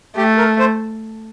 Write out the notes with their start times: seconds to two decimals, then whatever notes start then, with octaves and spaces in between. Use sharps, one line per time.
0.17 A3 G4
0.37 A#4
0.59 C5